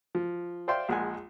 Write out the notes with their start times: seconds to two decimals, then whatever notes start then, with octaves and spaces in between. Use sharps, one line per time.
0.15 F3
0.68 C5 D5 E5 F5 G5 C6
0.89 A#1 G#3 F#5 G#5